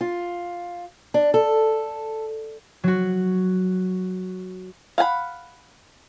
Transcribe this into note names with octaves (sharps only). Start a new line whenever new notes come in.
F4
D4
A4
F#3 F#4
F5 F#5 G#5 B5